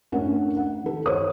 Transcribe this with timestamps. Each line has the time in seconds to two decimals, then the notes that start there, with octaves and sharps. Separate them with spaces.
0.12 A3 C#4 D4 A#4 F#5
0.57 F#5
0.84 D#3 A4
1.06 C5 C#5 D#6